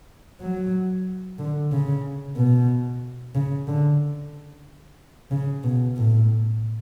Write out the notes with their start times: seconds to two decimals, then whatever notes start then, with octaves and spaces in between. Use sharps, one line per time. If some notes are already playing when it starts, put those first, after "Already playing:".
0.41 F#3
1.39 D3
1.72 C#3
2.36 B2
3.35 C#3
3.67 D3
5.31 C#3
5.64 B2
5.97 A2